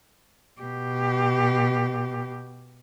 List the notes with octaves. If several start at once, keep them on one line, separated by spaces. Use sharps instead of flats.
B2 G4